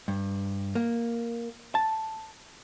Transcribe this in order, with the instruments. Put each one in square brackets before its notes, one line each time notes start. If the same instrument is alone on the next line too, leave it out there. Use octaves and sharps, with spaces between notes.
[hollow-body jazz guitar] G2
A#3
A5